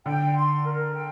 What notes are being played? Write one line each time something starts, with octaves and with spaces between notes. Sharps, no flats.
D3 G5
C6
A#4
G5